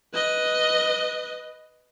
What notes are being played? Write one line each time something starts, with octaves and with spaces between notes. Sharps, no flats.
B4 D#5